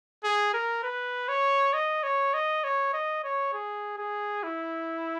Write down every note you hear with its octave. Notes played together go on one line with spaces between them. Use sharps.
G#4
A#4
B4
C#5
D#5
C#5
D#5
C#5
D#5
C#5
G#4
G#4
E4